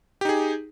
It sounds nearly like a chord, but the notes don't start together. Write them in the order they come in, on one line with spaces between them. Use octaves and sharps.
G4 D#4 G#4